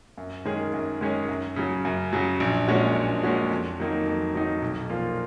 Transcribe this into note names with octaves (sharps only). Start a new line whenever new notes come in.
F#2
D#3 G#3 C#4 G#4
F#2
D#3 G#3 C#4 G#4
F#2
C#3 F#3
F#2
C#3 F#3
A#1
A#2 G#3 C#4 F#4
A#1
A#2 G#3 C#4 F#4
F2
D#3 F#3 A#3 D#4
F2
D#3 F#3 A#3 D#4
B1
A#2 F3 A#3 F4